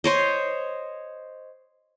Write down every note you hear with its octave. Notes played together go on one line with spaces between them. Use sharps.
C5 C#5 D#5